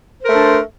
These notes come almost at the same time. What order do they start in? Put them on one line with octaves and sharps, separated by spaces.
C5 A#4 A3 D4